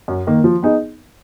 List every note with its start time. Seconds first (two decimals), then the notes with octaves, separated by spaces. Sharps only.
0.08 F#2
0.27 D#3 A#3
0.44 F3
0.63 B3 D#4 G#4